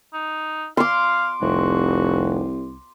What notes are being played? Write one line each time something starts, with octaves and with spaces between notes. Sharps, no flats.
D#4
F5 C6 D6
F1 C2 F#4